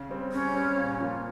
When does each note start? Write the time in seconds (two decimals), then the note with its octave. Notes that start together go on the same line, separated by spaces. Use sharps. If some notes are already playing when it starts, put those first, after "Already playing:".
Already playing: C#3
0.10 G3 C4
0.32 C#3 C#4
0.55 G3 C4
0.77 A#2
1.00 F3 A#3 F4